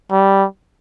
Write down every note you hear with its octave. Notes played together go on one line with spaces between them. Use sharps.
G3